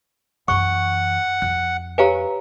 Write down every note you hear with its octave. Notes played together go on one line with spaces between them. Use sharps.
F#2 E3 F#5 C#6
F2 F#6
G4 B4 C#5 F5 G#5 A#5